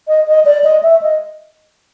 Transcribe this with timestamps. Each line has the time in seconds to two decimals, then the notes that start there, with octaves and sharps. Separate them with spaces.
0.08 D#5
0.27 D#5
0.45 D5
0.64 D#5
0.83 E5
1.02 D#5